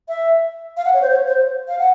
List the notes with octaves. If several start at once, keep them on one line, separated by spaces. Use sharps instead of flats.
E5
F5
F#5
C#5
C5
C#5
C5
F5
F#5